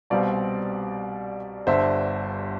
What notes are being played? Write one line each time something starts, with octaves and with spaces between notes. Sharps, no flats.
C2 B2 G3 C4 D5 F5
G1 G2 D3 C5 E5